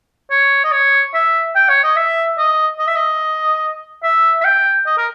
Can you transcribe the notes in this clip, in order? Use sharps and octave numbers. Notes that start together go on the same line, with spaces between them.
C#5
D#5
C#5
E5
G5
C#5
D#5
E5
D#5
D#5
E5
D#5
E5
E5
G5
D#5
A#4